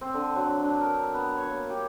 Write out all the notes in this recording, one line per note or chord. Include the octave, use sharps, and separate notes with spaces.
C4
D3
F#3
D4
A#4
B3
C#5
A#3
G4